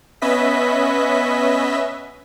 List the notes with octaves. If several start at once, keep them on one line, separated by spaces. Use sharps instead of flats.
B3 C#4 B4 D#5 E5 B6